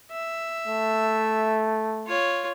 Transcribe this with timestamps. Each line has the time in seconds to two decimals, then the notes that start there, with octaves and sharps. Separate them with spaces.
0.11 E5
0.67 A3
2.07 F4 C#5